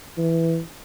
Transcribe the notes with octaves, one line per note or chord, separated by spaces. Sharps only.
E3